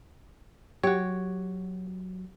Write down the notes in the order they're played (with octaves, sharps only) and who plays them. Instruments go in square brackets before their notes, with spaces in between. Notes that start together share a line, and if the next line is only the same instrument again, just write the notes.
[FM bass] F#3 [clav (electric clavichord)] F#4 C#5 [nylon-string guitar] G4